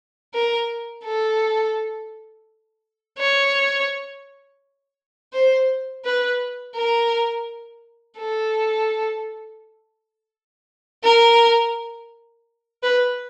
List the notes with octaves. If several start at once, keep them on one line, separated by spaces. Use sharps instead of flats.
A#4
A4
C#5
C5
B4
A#4
A4
A#4
B4